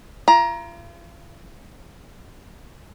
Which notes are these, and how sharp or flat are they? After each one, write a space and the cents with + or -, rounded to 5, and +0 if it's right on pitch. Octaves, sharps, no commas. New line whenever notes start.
F4 -40 A#5 +20